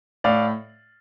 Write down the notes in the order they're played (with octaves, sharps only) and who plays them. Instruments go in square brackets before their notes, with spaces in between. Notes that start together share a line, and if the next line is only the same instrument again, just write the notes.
[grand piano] A2 D5 F5